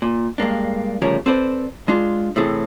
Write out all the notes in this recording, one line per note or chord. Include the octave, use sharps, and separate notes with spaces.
A#2
G2 G#3 A#3 D4
D2 C#3 F3 G3 A#4 C#5
C4 A4 B4 C5 D5
G#3 D4 F4
A2 C3 E3 C4 G#4 A4